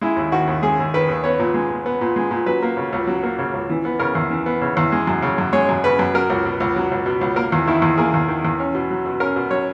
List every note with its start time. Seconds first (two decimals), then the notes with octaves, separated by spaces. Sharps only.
0.01 G#3 E4
0.16 D#2
0.32 D#3 F#4
0.47 D#2
0.62 G#3 G#4
0.79 D#2
0.94 D#3 B4
1.09 D#2
1.24 B3 C#5
1.39 A#2
1.54 G#3
1.70 A#2
1.86 B3
2.01 A#2
2.16 G#3
2.31 A#2
2.46 F#3 B4
2.62 A#3
2.77 C#3
2.93 C#2
3.07 F#3
3.23 A#3
3.39 C#3
3.53 C#2
3.69 E3
3.85 B3
3.99 C#3 A#4
4.15 E2
4.31 E3
4.46 B3
4.61 C#3
4.77 E2
4.92 G#3
5.07 F#2
5.22 C#3
5.38 F#2
5.53 G#3 C#5
5.69 F#2
5.84 C#3 B4
5.99 F#2
6.14 F#3 A#4
6.30 C#2
6.45 B2
6.60 C#2
6.76 F#3
6.91 C#2
7.06 B2
7.21 C#2
7.36 A#3 A#4
7.52 E2
7.67 D#3 E4
7.82 E2
7.97 A#3 G#4
8.14 E2
8.28 D#3
8.45 E2
8.59 C#4
8.75 B2
8.91 F#3
9.06 B2
9.20 C#4 A#4
9.36 B2
9.51 F#3 C#5